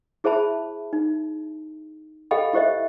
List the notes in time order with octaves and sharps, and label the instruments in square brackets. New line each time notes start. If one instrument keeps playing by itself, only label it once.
[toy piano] E4 G#4 C5 E5 A5 B5
D#4
G4 A4 D#5 F5 G5 B5
E4 G4 C5 D#5 E5